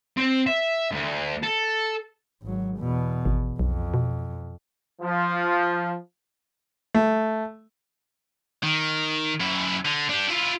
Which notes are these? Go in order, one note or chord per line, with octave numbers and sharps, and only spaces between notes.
C4
E5
D2
A4
G#1 F#3
E2 B2
G#1
B1 F2
B2
F3
A3
D#3
F#2 E4
D3
D4 G4
E4 F4